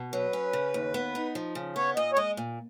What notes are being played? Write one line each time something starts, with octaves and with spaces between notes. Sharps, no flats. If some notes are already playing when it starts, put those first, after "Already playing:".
Already playing: B2
F#3 B4
C#4
C#3
D#2
B3
D#4
F3
C#3
B3 C#5
A#2 D#5
C#5
G#3 D#5
A#2